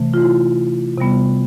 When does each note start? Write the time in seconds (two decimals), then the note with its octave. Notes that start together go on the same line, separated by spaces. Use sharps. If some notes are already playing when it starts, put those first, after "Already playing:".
Already playing: C3 E3 A3
0.14 F4
0.22 E4
0.98 C3 G3 B3